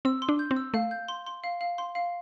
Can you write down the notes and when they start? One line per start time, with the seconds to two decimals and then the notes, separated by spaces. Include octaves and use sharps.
0.05 C4 E6
0.22 C6
0.29 D4
0.39 G6
0.51 C4
0.56 E6
0.74 A3 F5
0.91 G6
1.08 C6
1.26 C6
1.44 F5
1.61 F5
1.78 C6
1.95 F5